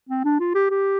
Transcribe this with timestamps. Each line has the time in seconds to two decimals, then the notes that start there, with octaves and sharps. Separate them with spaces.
0.09 C4
0.24 D4
0.40 F4
0.55 G4
0.70 G4